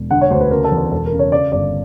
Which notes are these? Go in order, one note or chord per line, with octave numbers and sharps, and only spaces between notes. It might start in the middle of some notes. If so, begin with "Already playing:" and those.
Already playing: E1
D3 F#5
C#5
D2 C5
B4
C#3 A#4
A4
E2
A4
E1 A4
A#4
C#3
C#5
C#3 D5
G1 D5